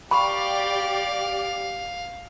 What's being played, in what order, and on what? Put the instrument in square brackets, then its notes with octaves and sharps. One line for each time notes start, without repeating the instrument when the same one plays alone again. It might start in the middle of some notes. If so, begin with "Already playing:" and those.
[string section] G4 D5 [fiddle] F5 [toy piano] B5 C#6